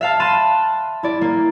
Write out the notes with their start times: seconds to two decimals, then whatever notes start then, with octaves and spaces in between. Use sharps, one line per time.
0.01 E5 F5 A5
0.20 A5 B5 C6 F#6 D#7 E7
1.03 E4 D5
1.21 A#3